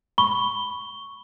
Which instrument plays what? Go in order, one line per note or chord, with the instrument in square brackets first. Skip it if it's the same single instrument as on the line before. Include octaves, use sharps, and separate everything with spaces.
[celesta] B5 C#6 G7